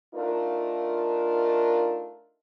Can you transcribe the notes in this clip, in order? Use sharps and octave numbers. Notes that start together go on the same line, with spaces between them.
A3 D4 D#4 F4 A#4